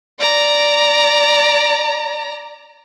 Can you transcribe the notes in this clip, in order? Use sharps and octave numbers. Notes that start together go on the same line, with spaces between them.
D5 A#5